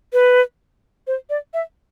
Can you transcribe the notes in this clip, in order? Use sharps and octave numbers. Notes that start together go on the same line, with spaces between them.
B4
C5
D5
E5